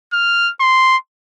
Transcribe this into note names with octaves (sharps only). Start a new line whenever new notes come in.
F6
C6